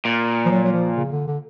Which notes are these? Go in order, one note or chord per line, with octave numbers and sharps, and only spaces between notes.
A#2
F3
F#3
F#3
F3
C#3
D3
D3